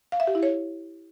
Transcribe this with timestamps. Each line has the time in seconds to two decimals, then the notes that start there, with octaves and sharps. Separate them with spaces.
0.12 F5
0.20 E5
0.27 G4
0.35 E4
0.43 C#5